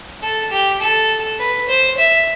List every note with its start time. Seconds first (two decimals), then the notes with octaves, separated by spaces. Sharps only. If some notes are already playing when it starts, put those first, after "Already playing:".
0.22 A4
0.51 G4
0.80 A4
1.39 B4
1.68 C5
1.98 E5